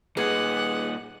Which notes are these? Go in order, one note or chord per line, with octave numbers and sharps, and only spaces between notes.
A#2 D#4 G#4 B4 F#5 D6 G#6